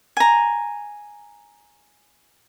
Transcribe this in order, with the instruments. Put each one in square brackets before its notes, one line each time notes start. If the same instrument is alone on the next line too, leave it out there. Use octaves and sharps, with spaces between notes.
[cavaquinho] G#5 A#5